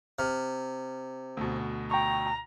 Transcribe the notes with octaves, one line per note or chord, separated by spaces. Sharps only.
C3 F6
D2 B2
G5 A#5 C#6